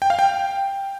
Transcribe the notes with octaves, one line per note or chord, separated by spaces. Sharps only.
G5
F5
G5